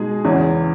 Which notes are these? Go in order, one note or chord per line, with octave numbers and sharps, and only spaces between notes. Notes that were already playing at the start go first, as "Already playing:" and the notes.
Already playing: B2 G#3 D#4 G#4
E2 C#3 E3